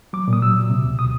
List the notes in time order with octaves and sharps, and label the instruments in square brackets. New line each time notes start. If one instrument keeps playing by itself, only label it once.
[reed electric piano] F#3 D6
A#2
D#6
F#3 E6
A#2
C3
D2
B2 D#6